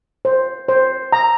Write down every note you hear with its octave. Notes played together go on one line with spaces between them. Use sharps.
C5
C5
A#5